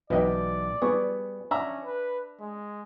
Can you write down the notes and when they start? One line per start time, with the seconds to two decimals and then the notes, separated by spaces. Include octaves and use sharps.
0.10 B1 B2 E3 B4 D5 D#5 G5
0.82 G3 B3 G#4 C#6
1.51 C#4 D4 E5 A#5 E6
1.85 B4
2.40 G#3